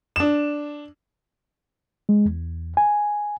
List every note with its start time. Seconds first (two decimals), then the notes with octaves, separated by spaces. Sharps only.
0.16 D4 E7
2.09 G#3
2.26 E2
2.77 G#5